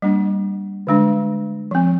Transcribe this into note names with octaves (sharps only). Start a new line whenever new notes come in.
G3 A#3 D4
D3 G#3 D4
F3 C4